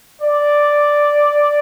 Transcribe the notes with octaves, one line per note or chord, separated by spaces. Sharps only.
D5